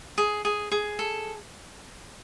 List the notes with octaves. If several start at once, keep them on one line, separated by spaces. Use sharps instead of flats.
G#4
G#4
G#4
A4